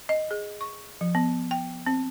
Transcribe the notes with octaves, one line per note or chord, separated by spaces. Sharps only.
D#5
G#4
C#6
F3
B3
G5
C4